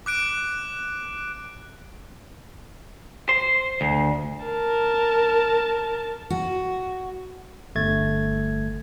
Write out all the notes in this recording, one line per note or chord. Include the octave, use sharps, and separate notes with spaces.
D6 F#6 D7
C5
D2
A#4 A5
F#4
G1 A3 G#6 A6